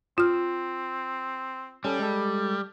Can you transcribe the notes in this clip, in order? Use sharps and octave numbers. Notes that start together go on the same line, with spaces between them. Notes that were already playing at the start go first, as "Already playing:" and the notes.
C4 F4 F6
G3 C#4 A4
G#3 A4